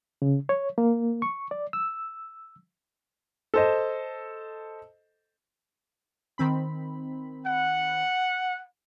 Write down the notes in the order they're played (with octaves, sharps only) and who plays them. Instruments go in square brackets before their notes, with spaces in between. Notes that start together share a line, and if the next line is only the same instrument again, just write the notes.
[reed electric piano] C#3
C#5
A#3
C#6
D5
E6
[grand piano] A4 C5 D#5
[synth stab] D#3 C4 B5
[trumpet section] F#5